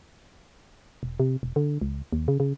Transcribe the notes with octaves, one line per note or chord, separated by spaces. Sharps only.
E1
C3
E1
D3
C#2
D#2
C#3
C#3